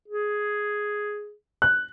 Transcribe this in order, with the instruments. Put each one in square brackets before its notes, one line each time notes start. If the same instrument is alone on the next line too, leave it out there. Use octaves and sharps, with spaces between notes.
[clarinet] G#4
[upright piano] F#6